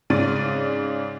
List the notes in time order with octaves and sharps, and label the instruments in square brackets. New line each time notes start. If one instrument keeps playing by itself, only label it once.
[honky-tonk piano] G#2 C#3 D5 A6 D#7